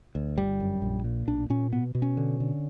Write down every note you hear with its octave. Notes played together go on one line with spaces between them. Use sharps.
D2
G1 G3
F#2
A#1
A#2
B1 D4
A#2 C#4
B2 B3
B2
C#4
D3
D3